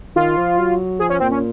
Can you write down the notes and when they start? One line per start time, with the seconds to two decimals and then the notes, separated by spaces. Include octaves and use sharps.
0.16 D#3 F4
0.37 F3
0.58 F#3
0.99 F3 G#4
1.10 C#4
1.20 A#2 C4
1.31 C#4